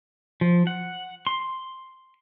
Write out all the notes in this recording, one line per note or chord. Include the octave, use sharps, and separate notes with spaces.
F3
F#5
C6